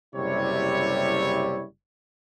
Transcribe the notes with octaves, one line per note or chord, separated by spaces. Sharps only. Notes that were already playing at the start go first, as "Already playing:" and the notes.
F#1 C3 G3 E4 C#5